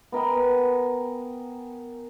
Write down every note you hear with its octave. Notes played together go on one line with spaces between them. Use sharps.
B3 A#4 G5 G#5